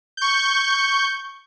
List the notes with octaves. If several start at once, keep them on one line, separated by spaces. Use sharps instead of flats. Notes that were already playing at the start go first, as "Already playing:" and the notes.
C#6 G6